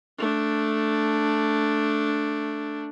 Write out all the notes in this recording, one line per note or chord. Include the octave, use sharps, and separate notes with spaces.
A3 D4